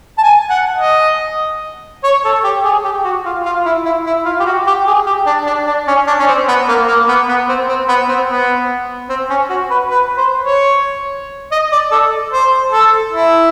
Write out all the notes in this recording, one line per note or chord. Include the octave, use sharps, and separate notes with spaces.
A5
G#5
F#5
D#5
C#5
A4
G4
G#4
G4
F#4
F4
F4
E4
E4
E4
F4
G4
F#4
G4
G#4
G4
D4
D4
D4
C#4
D4
C#4
C4
B3
A#3
A#3
B3
B3
C4
C4
B3
C4
B3
C4
C#4
F#4
B4
B4
C5
C#5
D#5
D5
A4
C5
A4
E4